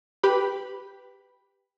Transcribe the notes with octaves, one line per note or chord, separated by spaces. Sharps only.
G4 B4 B5